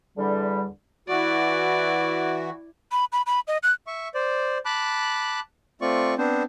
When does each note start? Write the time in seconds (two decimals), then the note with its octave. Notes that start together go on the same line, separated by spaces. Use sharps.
0.18 E2 D3 G3
1.08 E3 E4 F#4 D5
2.92 B5
3.12 B5
3.26 B5
3.48 D#5
3.63 F#6
3.87 E5 C#6
4.14 C5 D5
4.65 A5 B5 D6 F#6
5.81 A3 C4 F4 D5 C#6
6.18 B3 C4 D4 C5